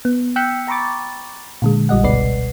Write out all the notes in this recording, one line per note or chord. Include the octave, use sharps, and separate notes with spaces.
B3
G5 E6 F#6 G6 B6 C#7
G5 A#5 B5 C#6 D6 A6
A#2 D3 G#3
A#1 G3 D#5 F#5
G1 C#2 B2 B4 D5 C7